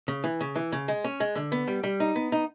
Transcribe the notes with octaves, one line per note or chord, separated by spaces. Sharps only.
C#3
E3
C#3
E3
C#3
G#3
C#4
G#3
D3
B3
G3
G3
D#4
B3
D#4